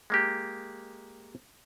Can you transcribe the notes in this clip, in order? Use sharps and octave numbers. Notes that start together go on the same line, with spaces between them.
G#3 A#3 G4